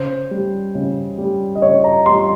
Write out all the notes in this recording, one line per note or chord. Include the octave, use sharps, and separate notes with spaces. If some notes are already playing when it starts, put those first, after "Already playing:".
Already playing: C#3 C5
G3
C#3
G3
D#5
C#3 C#5
A#5
G3 C6